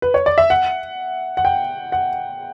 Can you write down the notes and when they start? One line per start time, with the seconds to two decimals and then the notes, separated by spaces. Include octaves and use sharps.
0.02 B4
0.14 C#5
0.26 D5
0.38 E5
0.50 F#5
1.37 F#5
1.45 G5
1.92 F#5